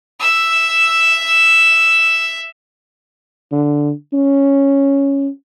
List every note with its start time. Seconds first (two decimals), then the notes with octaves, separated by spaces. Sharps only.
0.20 E5 E6
3.52 D3
4.14 C#4